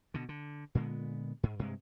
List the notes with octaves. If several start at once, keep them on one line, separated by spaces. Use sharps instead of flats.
B2 D3
D3
A#2 D3 G#3 B3
G#2
G2 C3 G#3